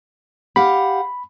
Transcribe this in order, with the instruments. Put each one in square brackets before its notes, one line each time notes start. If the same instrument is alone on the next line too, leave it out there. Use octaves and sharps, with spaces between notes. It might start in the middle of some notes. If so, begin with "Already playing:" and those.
[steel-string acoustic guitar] G4 F5 F#5 [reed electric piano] B5